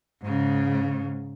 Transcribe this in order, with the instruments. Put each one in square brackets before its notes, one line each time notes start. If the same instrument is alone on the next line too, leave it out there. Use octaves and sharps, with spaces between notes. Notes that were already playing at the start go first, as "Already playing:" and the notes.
[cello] G#2 C#3